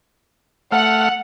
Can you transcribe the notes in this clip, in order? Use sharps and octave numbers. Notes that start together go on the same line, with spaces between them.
A3 F#5 F6